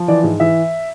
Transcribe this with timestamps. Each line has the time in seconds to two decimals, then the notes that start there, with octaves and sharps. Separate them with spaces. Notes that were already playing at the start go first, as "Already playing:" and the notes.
Already playing: F3
0.08 E3 D5
0.24 G#2
0.40 E3 E5